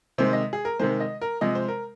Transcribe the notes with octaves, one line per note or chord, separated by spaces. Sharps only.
C3 D#3 G#3 C5
D#5
G#4
A#4
C3 D#3 G#3 C5
D#5
A#4
C3 F3 G#3 D#5
C5
A#4